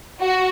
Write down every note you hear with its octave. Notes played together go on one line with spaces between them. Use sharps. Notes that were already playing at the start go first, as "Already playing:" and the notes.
F#4